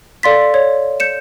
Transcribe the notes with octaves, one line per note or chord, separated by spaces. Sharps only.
A4 D5 F5 C6 A6 B6
C#5
G6 C#7 E7